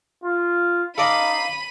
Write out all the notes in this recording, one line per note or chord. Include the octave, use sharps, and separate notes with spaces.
F4
D#4 A4 D5 D#5 F5 B5 D#7